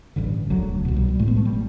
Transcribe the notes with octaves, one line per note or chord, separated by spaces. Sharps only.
A1 G2 D3
E1 D2 D3 F#3
C2 B2
G3
G3
A1 A2 A3
B3
A3
G3